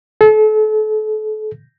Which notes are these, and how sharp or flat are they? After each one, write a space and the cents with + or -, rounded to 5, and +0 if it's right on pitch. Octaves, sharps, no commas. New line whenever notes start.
A4 -35